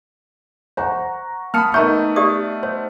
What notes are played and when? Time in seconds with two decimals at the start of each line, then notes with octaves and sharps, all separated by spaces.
0.77 C5 F#5 A#5 C#6
1.54 A#3 A5 B5 D#6 F6 C#7
1.74 A3 B3 D#4 A#4 E5 A#5 C#6 G6
2.16 G4 D5 D#6
2.63 C5